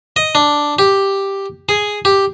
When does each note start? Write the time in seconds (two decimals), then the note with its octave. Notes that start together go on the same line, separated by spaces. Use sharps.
0.16 D#5
0.35 D4
0.79 G4
1.69 G#4
2.05 G4